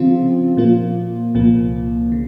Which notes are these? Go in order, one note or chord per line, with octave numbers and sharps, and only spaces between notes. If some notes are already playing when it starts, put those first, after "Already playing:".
Already playing: C#3 F3 C4 F4
A#2 F3 A#3 F4
C2 A#2 F3 A#3
C#3